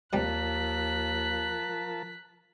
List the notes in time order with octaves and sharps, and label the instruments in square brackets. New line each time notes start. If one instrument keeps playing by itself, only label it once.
[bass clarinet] D#2 [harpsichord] C3 G3 [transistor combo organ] F3 A#4 A5 [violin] F#6 B6